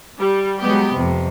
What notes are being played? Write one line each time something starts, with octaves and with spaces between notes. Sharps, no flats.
G3
F#3 G#3 B3 G4
F2 C3